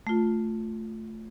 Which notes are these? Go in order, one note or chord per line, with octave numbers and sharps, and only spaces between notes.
A3 F4